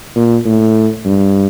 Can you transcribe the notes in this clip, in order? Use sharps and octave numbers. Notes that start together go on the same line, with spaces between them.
A#2
A2
G2